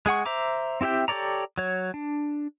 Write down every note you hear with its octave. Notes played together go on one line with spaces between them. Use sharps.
G#3 G#4 F#5 C#6
C5 E5 A#5 D6
C4 E4 G4 E5 G5
G4 A4 C#5 D5 A#5
F#3 C#5
D4